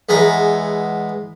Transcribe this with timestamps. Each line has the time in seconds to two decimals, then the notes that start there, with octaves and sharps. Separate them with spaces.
0.09 E2 G#3 B3 A#5